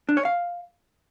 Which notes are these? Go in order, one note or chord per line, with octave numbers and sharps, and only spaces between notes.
D4
C#5
F5